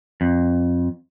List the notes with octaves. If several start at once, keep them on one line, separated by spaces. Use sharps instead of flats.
F2